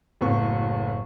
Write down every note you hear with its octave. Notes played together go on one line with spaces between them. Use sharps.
F#1 A2 B3 C#6